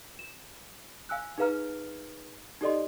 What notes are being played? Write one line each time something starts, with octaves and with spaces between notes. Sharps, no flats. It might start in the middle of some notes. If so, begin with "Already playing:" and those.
E7
F5 G#5 E6 F#6
D#4 G#4 B4 F5 A#5 F6
D#4 G4 A4 D5 D#5 C6